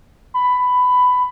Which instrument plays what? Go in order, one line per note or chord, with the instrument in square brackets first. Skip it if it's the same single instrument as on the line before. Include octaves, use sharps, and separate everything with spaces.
[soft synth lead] B5